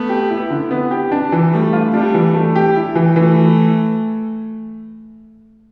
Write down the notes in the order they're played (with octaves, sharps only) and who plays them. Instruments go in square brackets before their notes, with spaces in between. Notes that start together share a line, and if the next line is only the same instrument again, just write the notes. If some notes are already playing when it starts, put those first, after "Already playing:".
Already playing: [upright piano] A3 [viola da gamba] B3
[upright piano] G4
E4
D3
B3
G4
D4
E3
[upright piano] G3 [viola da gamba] A3
[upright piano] F4
[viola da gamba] G3 [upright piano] D4
[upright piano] E3
A3
G4
E4
E3
[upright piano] E3 [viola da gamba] A3